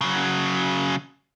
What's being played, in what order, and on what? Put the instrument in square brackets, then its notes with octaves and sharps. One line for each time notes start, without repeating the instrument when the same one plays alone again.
[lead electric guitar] C#3 F#3